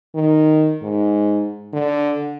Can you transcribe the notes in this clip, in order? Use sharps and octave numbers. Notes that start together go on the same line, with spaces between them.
D#3
G#2
D3